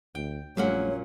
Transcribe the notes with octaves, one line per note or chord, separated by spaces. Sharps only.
D2 G5
A#1 F#2 A#2 G3 A3 C#5 F#5